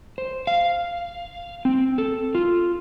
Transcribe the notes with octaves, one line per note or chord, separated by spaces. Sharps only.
C5
F5
C4
A4
F4